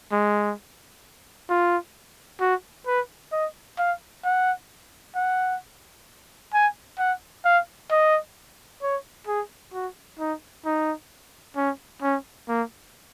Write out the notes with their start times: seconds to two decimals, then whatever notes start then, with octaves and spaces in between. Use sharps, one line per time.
0.12 G#3
1.50 F4
2.41 F#4
2.87 B4
3.32 D#5
3.78 F5
4.24 F#5
5.15 F#5
6.54 G#5
6.99 F#5
7.45 F5
7.91 D#5
8.82 C#5
9.27 G#4
9.73 F#4
10.19 D#4
10.65 D#4
11.56 C#4
12.02 C#4
12.49 A#3